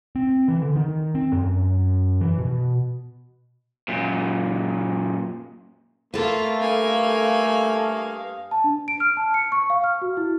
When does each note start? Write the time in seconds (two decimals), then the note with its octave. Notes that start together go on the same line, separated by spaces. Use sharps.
0.16 C4
0.48 E3
0.62 D3
0.76 D#3
1.15 C4
1.32 F#2
2.21 E3
2.38 B2
3.88 F#2 A#2
6.14 A3 A#3 F4 A4 B4
6.60 G2 A#3 D#5 F5 G#5
8.51 A5
8.64 D4
8.88 D7
9.00 F6
9.17 A5
9.34 C#7
9.52 C#6
9.70 F5
9.84 F6
10.02 F#4
10.17 E4